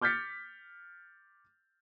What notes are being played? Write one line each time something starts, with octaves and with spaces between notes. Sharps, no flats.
D6 F6 G6 A6 B6 C#7